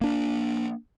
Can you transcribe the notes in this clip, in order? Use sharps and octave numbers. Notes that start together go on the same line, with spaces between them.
A#3 D4